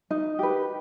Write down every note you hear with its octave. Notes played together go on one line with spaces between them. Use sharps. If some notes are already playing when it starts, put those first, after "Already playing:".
D#4
G4 B4